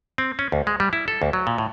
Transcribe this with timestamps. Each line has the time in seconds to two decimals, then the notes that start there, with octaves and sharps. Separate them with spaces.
0.18 C4
0.39 C#4
0.52 D2
0.67 G#3
0.80 G3
0.93 E4
1.08 A4
1.22 D2
1.33 F#3
1.47 A#2
1.58 A2